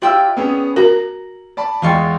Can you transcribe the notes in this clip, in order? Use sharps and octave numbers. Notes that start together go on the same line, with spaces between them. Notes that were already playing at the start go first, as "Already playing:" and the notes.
E4 F4 G4 D5 G5 E6
B3 C#4 G#4
F#4 A#4 A#5 F#7
D5 A5 B5
E2 G#3 A#3 F4 G5 C#6